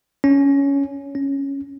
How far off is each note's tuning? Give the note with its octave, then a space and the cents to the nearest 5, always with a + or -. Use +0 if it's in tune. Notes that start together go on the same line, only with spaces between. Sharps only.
C#4 +10
C#4 -5